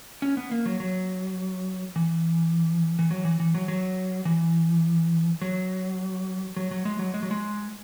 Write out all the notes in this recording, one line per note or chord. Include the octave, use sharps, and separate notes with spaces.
C#4
B3
A#3
F#3
F#3
E3
E3
F#3
E3
E3
F#3
F#3
E3
F#3
F#3
F#3
G#3
F#3
G#3
F#3
G#3